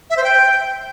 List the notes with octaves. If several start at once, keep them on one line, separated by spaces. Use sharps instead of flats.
E5
C5
G5